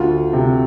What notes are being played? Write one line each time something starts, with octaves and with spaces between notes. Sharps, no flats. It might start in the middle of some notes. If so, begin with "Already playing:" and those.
Already playing: D2 F4
C3